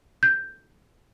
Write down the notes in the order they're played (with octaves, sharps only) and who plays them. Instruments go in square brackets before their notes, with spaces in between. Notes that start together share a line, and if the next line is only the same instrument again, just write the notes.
[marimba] G6